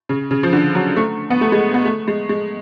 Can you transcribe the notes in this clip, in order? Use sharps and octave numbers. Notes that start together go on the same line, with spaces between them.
C#3
C#3
F3
D3
F#3
A3
B3
A3
G#3
B3
A3
G#3
G#3